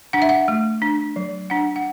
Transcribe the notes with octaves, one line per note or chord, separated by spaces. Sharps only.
D4 F#5
E5
F#5
A3
D4
F#3
D4 F#5
F#5